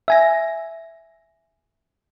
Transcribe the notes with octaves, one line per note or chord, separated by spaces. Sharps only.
E5 G#5 A#6